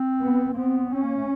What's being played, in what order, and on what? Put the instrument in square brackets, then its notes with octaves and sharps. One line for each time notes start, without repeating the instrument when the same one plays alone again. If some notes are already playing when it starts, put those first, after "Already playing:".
Already playing: [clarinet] C4
[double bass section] B3
[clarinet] A#3
[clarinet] B3 [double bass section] C4
[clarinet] C4 [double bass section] C#4
[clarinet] A#3
A3